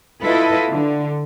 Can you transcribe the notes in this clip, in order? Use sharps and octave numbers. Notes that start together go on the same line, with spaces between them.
E4 F4 A4 B4 D#5
D3